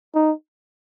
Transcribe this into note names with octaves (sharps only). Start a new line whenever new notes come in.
D#4